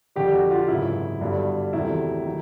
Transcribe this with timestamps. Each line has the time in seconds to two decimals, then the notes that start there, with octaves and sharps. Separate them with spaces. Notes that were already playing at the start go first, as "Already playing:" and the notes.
0.16 F2 D3 G3 G4
0.34 F#4
0.51 F4
0.68 G#1 F#2 C#3 E4
1.21 G1 G2 D3 F#3
1.73 E2 C3 D#3 F#3 A3 E4
2.26 D#3 F#3